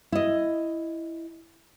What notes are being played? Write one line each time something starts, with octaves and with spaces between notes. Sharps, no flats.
E4 D#5